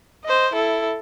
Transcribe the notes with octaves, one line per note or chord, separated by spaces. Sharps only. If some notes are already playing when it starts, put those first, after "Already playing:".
C5 D#5
E4 A4